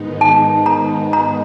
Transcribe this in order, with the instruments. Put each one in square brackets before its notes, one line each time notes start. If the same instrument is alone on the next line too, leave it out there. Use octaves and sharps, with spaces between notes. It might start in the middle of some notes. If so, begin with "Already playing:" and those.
Already playing: [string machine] G#2 D#3 G#3 B3 D#4
[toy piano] A5
A#5
A#5